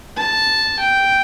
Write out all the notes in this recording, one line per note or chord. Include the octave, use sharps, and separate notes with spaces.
A5
G5